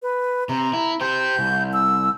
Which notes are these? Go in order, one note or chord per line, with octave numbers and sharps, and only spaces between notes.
B4
C3 A#5
E4
G4 C5 G6
C2
E6